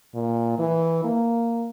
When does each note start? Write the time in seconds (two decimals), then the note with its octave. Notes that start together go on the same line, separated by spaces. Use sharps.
0.15 A#2
0.59 E3
1.04 A#3